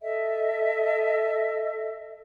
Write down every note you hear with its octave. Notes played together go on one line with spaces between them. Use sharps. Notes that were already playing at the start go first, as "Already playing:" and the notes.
A4 D#5 E5